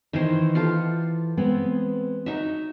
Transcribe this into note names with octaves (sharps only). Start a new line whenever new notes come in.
D#3 E3 C5 D#5
F4 G4 A4
G#3 B3 C4
D#4 F#4 E5